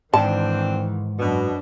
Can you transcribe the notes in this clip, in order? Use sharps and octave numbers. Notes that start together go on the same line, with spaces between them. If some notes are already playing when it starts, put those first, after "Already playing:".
G#2 D#3 E3 C4 D4 A5
F#2 B2 D4